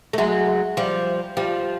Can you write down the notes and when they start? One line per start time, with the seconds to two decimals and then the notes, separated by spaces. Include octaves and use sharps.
0.13 A3
0.18 F#3 G#3
0.77 F3 G3
1.37 F3 G3